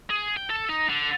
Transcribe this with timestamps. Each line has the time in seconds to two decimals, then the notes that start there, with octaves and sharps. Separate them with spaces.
0.10 G#4
0.37 G5
0.50 A4
0.69 D#4
0.89 D3